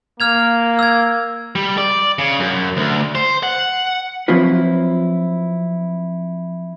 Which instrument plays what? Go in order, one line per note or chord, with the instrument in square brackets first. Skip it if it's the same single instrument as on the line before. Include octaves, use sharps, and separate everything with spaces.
[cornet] A#3 [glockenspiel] F6 G#6 F7
[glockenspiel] E6 G#6
[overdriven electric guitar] G3
D5
C#3
F#2
D2
C5
F#5
[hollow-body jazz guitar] F3 F#3 C4 E4 F4 B4